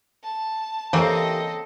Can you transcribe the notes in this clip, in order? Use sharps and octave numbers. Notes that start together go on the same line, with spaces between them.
A5
C#3 E3 A#3 C4 G4 A4 A#4 D#5